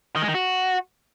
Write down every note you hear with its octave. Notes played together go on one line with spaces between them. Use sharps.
D#3
G#3
D#3
F#4